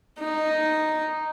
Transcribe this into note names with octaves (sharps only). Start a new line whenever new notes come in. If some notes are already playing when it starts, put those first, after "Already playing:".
D#4